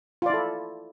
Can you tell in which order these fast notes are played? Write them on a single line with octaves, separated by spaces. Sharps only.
F4 D5 E4 A4